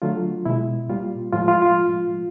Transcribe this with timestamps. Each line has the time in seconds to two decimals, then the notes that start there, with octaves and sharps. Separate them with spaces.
0.02 D3 F#3 A3 F4
0.46 B2 G#3 E4
0.89 A#2 G3 F4
1.33 A2 F3 G#3 F4
1.48 F4
1.62 F4